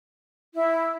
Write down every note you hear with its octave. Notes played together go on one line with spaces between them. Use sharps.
E4